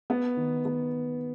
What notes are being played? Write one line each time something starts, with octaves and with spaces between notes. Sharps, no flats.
B3
D#3
B3